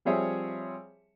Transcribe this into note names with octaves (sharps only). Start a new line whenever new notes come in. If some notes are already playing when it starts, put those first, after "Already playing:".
F3 G3 C4 G#4 C#5 E5